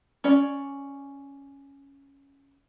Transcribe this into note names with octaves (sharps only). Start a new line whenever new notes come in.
C#4 D5